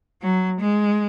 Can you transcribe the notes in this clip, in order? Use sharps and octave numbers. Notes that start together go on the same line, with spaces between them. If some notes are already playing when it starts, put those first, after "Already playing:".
F#3
G#3